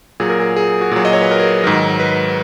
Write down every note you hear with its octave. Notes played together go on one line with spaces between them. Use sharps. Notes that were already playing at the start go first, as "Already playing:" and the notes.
A#2 F#3 G#4
A#4
G#4
G#4
F#4
A#2 F#3 G#4
D#5
C#5
B4
A#4
G#4
G#2 D#3 F#3 A#4
B4